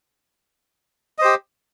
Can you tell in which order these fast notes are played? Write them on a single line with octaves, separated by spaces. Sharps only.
D#5 C5 G4